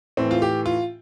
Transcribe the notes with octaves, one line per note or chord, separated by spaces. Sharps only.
A2 E3 C4
F4
G4
F4